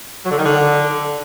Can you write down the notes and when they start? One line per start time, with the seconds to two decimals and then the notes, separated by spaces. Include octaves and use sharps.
0.24 F#3
0.31 D3
0.38 D#3
0.45 D3